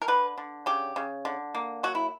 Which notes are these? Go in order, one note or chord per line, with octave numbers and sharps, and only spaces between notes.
A#4
D3 B4
D3
C#3 G4
C#3
D3
A#3
F#3 F#4
E4